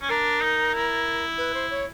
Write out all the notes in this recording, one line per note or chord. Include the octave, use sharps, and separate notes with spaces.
C#4
D4 A#4
D#4
E4
B4
C5
C#5